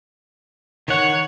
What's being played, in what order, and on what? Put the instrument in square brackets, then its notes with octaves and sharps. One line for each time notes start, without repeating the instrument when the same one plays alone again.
[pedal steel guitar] D#3 F#5 [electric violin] C#5